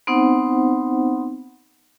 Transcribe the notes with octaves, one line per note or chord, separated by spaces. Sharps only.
B3 C4 D#4 C5 F#5